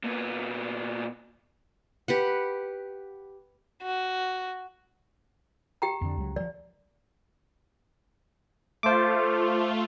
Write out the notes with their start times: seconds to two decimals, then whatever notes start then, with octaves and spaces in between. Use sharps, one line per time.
0.04 A#2 B3
2.08 G4 B4 F#5
3.82 F#4
5.82 G4 G5 A#5
6.01 F2 D3
6.17 C#2 F#3
6.36 F3 F#3 D5
8.83 A3 F4 C5 D6